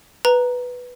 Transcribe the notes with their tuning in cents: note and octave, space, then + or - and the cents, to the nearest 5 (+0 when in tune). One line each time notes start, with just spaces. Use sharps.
B4 +0 A#5 +0